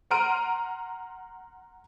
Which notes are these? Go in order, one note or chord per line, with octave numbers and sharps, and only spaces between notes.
F#5 A#5 C6 F6 D7 D#7